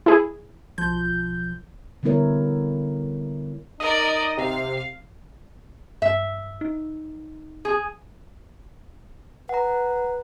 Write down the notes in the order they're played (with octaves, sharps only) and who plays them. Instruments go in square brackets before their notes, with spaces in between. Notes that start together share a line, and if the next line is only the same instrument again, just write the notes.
[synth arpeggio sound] E4 G#4
[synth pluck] B1 F3 G6
[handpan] D3 G3 B3 E4 A#4 C#5
[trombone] D#4 [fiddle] A#4 D5 [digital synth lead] D#5
[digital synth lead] C3 [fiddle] F5
[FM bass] G2 [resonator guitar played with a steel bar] E5
[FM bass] D#4
[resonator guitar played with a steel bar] G#4
[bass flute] B4 [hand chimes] F#5 A#5